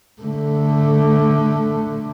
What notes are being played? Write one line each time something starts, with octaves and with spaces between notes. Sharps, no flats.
D3 A3